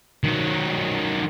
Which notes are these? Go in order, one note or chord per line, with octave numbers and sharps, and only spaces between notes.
D#3 F#3